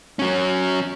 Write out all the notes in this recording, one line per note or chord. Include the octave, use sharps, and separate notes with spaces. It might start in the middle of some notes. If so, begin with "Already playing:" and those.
F#3 C#4